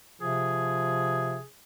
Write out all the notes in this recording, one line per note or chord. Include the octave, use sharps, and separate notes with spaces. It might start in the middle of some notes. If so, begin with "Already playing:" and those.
C3 F3 G#4